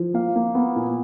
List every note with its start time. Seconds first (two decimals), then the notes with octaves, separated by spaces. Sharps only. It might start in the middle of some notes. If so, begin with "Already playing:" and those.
Already playing: F3
0.14 A#3 F5
0.36 A#3
0.55 B3
0.76 A#2